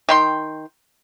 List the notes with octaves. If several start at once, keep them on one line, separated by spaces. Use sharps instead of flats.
D#3 G5 C6